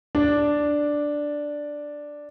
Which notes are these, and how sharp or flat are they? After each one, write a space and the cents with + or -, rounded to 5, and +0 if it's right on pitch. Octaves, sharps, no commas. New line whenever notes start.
D4 +0 D5 +0